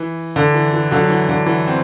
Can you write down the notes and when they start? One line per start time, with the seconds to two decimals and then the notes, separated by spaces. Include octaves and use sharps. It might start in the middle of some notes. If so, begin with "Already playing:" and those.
Already playing: E3
0.36 D3
0.54 E3
0.73 E3
0.91 D3 F#3
1.02 F#3
1.10 E3
1.29 D3
1.46 E3
1.67 C4